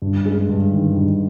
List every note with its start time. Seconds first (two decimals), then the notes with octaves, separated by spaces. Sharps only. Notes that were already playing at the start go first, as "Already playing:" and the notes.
0.02 G2
0.26 G#3
0.49 G2
0.73 D#3
0.97 G2